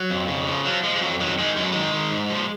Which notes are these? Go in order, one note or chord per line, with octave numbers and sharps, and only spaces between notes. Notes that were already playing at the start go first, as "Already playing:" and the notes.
Already playing: F#3
F2
C#3
F3
F3 F#3
F3 G#3
G#3
F2 F#3
D#3 F#3
D#3 G#3
F#2 G#3
F#3
D#3 G#3
D#3
G#2
F3